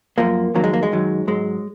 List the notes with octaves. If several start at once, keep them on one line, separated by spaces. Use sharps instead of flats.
F#2 F3 A#3
F2 D#3 F#3 A#3
G#3
A#3
G#3
F#2 D#3 F#3
G#2 F#3 G#3